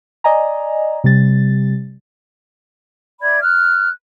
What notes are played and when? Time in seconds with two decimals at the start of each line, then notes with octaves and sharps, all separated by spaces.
0.24 D5 D#5 G#5 A#5
1.04 C3 G3 A6
3.21 D5 E5 B5 G#6
3.43 F6 F#6